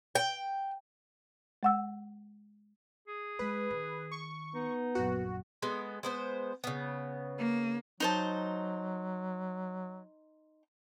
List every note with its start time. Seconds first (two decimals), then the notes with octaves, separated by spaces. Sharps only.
0.15 G5
1.63 G#3 F#5 E6
3.08 G#4
3.39 G#3 B4
3.70 D#3
4.11 C#6
4.55 B3 D#4
4.95 A#1 F#2 F#4
5.62 G#3 B3 A4
6.03 G#3 B3 C5
6.64 C#3 B3
7.39 A#3
8.00 F#3 D#4 C5 A5